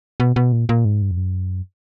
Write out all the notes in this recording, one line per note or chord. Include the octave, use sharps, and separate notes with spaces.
B2
B2
A#2
A#2
G#2
G2
F2
F#2